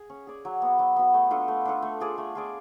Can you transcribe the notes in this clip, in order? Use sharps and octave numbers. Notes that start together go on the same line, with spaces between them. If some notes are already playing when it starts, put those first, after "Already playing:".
Already playing: G#4
C#4
G#4 D5
F#3
B3 F#4
F#3
B3 F#4
A3
D4 F4 A4
A3
D4 F4 A4
A3
F4 G#4 D5
A3
F4 G#4 D5